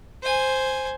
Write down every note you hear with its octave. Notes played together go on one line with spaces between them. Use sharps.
C5 G#5